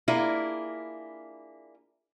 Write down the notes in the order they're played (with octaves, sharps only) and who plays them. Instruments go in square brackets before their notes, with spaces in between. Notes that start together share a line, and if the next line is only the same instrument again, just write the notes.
[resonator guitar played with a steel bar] A#3 D4 E4 F4 G#4